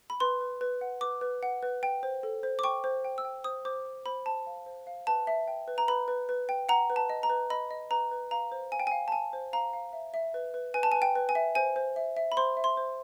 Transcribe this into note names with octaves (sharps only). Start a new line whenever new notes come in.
B5
B4 C6
B4
B4
F#5
B4 D6
B4
F#5
B4
G5
C5
A4
C5
D6
G5 C#6
C5
G5
E6
G5
C5 D#6
C5 D6
C5
C5 B5
C5 A5
F5
C5
F5
B4 A5
E5
G5
B4
A#5
B4 B5
B4
B4
G5
F#5 A#5
B4
A5
D#5
A#5
B4
D#5 B5
D#5
B4 A#5
B4
F5 A#5
C5
F5 G#5
G5
F5 G#5
A5
F5 G#5
C5
F5 A#5
F5
E5
E5
B4
B4
B4 G#5
A5
G#5
B4
G5
B4
G#5
E5
C5 G#5
C5
E5
E5
B5
C5 C6
E5
C6
C5